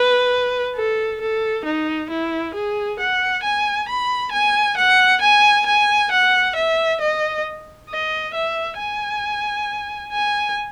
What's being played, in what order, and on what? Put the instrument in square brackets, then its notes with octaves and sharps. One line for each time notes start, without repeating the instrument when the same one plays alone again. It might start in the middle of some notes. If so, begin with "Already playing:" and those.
Already playing: [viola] B4
A4
A4
D#4
E4
G#4
F#5
G#5
B5
G#5
F#5
G#5
G#5
F#5
E5
D#5
D#5
E5
G#5
G#5